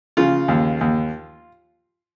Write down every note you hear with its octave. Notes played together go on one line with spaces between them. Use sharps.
C#3 F4
D#2
D#2